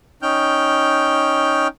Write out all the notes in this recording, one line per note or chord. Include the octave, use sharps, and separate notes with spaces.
C#4 D#4 G5 F6 G6